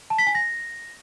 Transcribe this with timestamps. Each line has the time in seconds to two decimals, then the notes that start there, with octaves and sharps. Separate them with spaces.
0.10 A5
0.18 B6
0.27 G#5
0.35 A#6